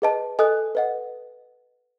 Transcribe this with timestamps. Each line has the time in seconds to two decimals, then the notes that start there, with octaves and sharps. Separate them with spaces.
0.02 G#4 B4 D#5 A5
0.39 A4 D#5 G#5 D#6 F#6
0.75 B4 D#5 F#5